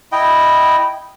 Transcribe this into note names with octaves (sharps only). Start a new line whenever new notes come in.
E4 D#5 G5